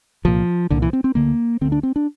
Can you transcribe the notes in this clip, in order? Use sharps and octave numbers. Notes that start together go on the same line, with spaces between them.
C2 A#2 F3
C2 A#2 D3
E3
C4
C4
D2 D3 A#3
D2 D3 C4
D4
C4
D4